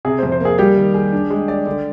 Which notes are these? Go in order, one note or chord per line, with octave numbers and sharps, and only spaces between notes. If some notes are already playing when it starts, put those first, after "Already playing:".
C3 G#4
C5
F2
C5
A#3 G#4
G3 G4
D#3
G#4
D4
G#3
D5
D3